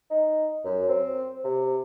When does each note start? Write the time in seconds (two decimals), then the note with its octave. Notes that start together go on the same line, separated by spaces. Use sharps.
0.10 D#4
0.65 F#2
0.89 C4
1.44 C3